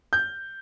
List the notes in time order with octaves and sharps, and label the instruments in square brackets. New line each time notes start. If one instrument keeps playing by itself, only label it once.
[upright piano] G6